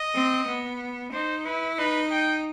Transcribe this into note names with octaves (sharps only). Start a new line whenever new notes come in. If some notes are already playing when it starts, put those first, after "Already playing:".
Already playing: D#5
C4
B3
D#4 C5
E4 B4
D#4 B4
G5